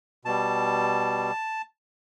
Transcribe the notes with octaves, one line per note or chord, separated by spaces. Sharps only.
B2 G3 A5